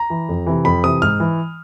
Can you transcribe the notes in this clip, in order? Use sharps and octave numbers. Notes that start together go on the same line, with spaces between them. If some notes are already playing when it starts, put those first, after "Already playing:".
Already playing: A#5
E3
F2
C3 E3
F2 B5
C3 E3 D#6
G#2 F6
E3